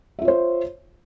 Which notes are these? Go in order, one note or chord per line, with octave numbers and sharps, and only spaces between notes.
F4 C5 C#5 E5